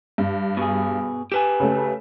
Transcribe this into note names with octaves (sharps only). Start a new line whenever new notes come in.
G2
B2 G#4
G4 B4 G#5 E7
C#3 A3